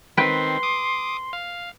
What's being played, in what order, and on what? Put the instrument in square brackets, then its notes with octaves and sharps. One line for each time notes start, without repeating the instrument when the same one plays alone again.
[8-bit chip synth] D#3 C4 [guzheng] B4 G5 [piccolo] C6
[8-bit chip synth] D6 D#6
F5